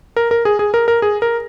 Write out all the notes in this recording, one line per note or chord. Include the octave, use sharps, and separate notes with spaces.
A#4
A#4
G#4
G#4
A#4
A#4
G#4
A#4